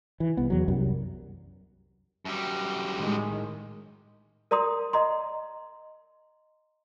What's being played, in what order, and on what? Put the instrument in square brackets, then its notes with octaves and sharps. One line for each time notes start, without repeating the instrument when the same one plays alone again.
[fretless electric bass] E3
C2 B3
E2 F#3
C2 F#2 G3
[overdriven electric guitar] F#2 G3
[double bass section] A2 D#3 G#3
[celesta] A#4 D5 A#5 C6 D#6
D#5 A#5 C6